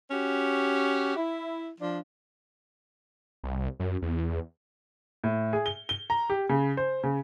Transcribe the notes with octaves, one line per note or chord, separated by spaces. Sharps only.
C#4 F#4 G4
E4
F3 D4
C2
F#2
E2
A2
G#4
G7
G7
A#5
G4
C#3
C5
C#3